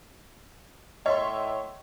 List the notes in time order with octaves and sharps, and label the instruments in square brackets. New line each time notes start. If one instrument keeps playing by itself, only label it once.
[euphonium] A2 [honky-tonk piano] C#5 E5 C6 [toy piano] D#5